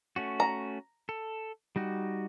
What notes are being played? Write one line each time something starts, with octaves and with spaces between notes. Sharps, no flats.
A3 C#4 F#4
A#5
A4
G3 D#4 F#4